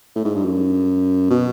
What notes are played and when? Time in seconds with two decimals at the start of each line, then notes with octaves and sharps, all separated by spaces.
0.15 A2
0.25 G#2
0.35 G2
0.44 F#2
1.30 B2